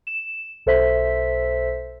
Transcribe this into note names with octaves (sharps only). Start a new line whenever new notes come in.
E7
B1 A4 C5 E5 B6